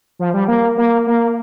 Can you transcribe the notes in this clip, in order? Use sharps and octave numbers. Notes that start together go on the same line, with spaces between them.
F3
G3
A#3
A#3
A#3